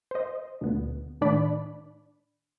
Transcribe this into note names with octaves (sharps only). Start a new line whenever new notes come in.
C5 D#5
D2 A#2 D3 B3
A2 D#3 D4 D5 B5